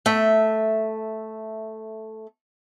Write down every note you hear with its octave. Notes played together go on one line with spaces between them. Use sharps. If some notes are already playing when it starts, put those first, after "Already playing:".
A3 E5